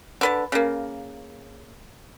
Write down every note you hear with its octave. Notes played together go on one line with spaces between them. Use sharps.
D3 B4 A5
C#3 A#3